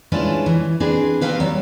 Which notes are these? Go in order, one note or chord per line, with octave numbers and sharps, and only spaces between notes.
G#3 C#4 D4 E4 F4 B4
E3
C4 D4 G#4 B4
C4 D#4 G4 A#4 B4 F5
F#3 G3